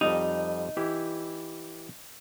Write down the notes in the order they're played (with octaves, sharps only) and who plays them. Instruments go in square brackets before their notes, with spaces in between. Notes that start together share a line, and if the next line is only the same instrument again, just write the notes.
[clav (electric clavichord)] F2 G3 [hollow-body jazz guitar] D#4
[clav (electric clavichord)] E3 E4 G4